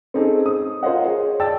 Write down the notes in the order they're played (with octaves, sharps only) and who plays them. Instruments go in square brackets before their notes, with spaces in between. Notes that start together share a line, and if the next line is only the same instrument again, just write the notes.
[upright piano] C4 C#4 D#4 G#4 A4
D#6
F4 A#4 C5 C#5 D#5 F#5
G#4 C#5
D5 D#5 G5 A5 E6 A6